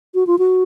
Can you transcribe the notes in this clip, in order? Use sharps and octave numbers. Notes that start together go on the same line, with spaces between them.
F#4
F4
F#4